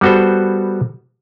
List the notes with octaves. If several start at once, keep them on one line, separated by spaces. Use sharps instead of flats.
G3 B3 F#4 A4 C5